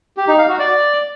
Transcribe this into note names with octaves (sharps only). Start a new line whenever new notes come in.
G4
D#4
F5
F#4
D5